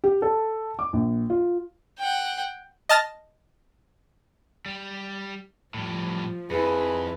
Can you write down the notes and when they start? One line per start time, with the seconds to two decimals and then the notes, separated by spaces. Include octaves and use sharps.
0.04 G4
0.22 A4
0.79 D6
0.93 A#1
1.30 F4
1.99 F#5 G5
2.89 D#5 A5 F6 A6 A#6
4.66 G3
5.74 A2 F3 G3
6.51 F2 E4 G#4 B4